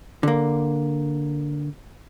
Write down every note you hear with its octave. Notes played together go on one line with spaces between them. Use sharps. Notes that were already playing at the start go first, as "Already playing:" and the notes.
D3 A#3